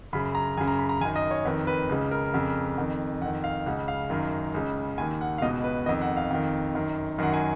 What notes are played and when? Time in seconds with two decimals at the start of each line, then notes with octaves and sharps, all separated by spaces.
0.13 F#2 C#3 B5
0.35 A#5
0.57 F#2 G#5
0.61 C#3
0.68 A#5
0.79 B5
0.89 A#5
1.01 F#2 G#5
1.05 D#3
1.16 D#5
1.31 C#5
1.45 F2 D#3 B4
1.67 B4
1.89 C#2 C#3
2.11 A#4
2.34 F2 C#3
2.78 F2 D#3
3.22 F2 D#3 F#5
3.44 F5
3.66 C#2 C#3 F#5
3.88 F5
4.10 F#2 D#3
4.54 C#2 C#3
4.98 D#2 D#3 G#5
5.21 F#5
5.38 F5
5.42 C#2 B2 D#5
5.64 B4
5.86 D#3 D#5
5.89 F2
6.02 F#5
6.17 F5
6.30 F2 D#3
6.75 F#2 D#3
7.18 F#2 D#3 F#5
7.34 G#5